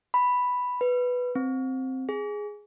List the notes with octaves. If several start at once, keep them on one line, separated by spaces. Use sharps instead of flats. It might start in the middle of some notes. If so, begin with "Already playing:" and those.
B5
B4
C4
G#4